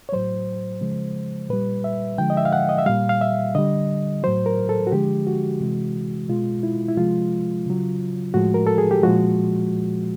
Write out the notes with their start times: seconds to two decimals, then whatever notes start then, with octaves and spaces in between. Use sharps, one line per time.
0.09 C#5
0.12 A2 F#3 C5
0.81 C#3 F3 G#3
1.49 A#2 G3 B4
1.84 E5
2.18 D3 F3 G#3 G5
2.30 D#5
2.37 E5
2.45 F5
2.53 F#5
2.69 D#5
2.78 E5
2.86 A#2 G3 F5
3.09 F5
3.21 E5
3.55 D3 G3 D#5
4.23 A2 F#3 C5
4.46 A#4
4.69 A4
4.87 F#4
4.92 D3 F3 G#3 G4
5.27 F#4
5.61 C3 E3 G#3
6.29 B2 G#3 F4
6.63 E4
6.88 E4
6.97 C3 F3 G#3 F4
7.66 C#3 F#3
8.34 A2 F3 G#3 F#4
8.54 A#4
8.67 A4
8.78 G#4
8.91 G4
9.03 A#2 F3 G#3 F#4